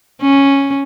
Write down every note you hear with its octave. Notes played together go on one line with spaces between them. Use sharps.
C#4